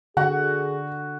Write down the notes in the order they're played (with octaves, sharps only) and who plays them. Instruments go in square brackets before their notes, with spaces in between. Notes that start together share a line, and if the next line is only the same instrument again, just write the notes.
[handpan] D3 [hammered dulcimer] F#4 [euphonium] G#4 [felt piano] F#5